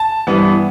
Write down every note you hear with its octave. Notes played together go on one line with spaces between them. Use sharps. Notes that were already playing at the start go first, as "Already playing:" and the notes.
Already playing: A5
G2 E3 B3